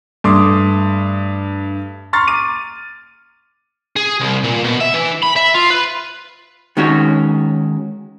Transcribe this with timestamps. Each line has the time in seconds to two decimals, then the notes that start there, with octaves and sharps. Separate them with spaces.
0.24 G2 A3 C6 D6 D#6
2.13 A#5 C6 C#6 F6 A6
2.28 D6 D#7
3.96 G#4
4.21 C2
4.44 A#2
4.64 B2
4.81 E5
4.94 E3
5.23 B5
5.36 E5
5.54 F4
5.70 B4
6.77 D#3 G#3 C#4 F#4 C#5